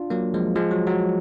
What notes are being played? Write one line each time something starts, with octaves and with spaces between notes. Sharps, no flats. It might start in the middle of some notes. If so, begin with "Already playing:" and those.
Already playing: D4 F4
F#3 A#3
F3 G#3
F3 G#3
F#3
F#3